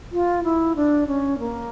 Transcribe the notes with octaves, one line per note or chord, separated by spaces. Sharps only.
F4
E4
D4
C#4
A#3